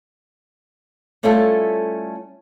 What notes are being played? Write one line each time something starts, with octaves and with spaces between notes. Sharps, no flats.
G3 A3 C#4 E4 F4 A4